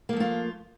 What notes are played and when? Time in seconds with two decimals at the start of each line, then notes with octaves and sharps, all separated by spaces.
0.09 A#3
0.13 F3
0.17 A3
0.20 F4